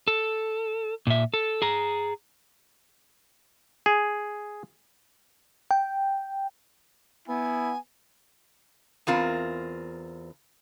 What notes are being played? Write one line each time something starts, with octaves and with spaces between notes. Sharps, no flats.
A4
A#2 E5
A4
G#4 A#5
G#4
G5
B3 E4 G#5
E2 C4 F4 A#4